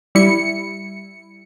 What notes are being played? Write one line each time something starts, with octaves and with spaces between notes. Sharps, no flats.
G3 E4 C#7